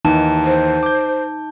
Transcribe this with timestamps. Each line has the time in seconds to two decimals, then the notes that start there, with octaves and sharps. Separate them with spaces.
0.05 D#2 E3 D#4 A5
0.45 C5
0.83 D6 G6